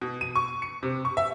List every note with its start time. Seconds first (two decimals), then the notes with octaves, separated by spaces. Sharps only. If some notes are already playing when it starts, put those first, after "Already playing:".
0.01 B2
0.21 D#7
0.36 C#6
0.62 C#7
0.83 C3
1.05 C#6
1.17 E5